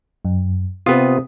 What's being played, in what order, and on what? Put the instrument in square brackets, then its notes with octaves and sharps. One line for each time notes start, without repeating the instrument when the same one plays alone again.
[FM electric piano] F#2
[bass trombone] C3 [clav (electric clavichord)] B3 F4 [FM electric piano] G4 D#6